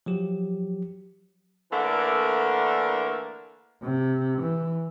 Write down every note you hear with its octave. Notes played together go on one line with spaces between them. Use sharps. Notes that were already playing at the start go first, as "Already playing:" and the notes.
F3 F#3 G4
D3 E3 A3 A#3 D4 A#4
C3
E3